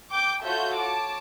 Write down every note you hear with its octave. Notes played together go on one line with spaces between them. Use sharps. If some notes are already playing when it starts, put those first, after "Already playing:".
G5 D6 G6
F4 F#4 A4 C#5 E5 G6
C#5 A5 D6